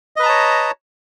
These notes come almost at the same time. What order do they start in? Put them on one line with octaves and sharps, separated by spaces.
D#5 B4 A#5 A5 C#5